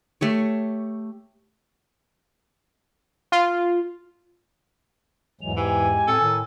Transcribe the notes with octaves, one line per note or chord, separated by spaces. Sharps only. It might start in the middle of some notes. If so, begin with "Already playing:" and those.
A3 G4 C#5
F4
E2 G#2 E3 F#3 G#3 F7
E3 G#3 G4 G#5
A2 C4 A4
A2 D#3